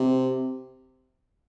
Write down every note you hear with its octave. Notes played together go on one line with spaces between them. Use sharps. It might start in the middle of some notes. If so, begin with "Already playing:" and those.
Already playing: C3